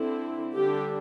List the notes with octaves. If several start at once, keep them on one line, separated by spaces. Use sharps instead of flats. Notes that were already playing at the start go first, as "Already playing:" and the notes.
Already playing: D3 C4 E4
D3 G3 D4 G4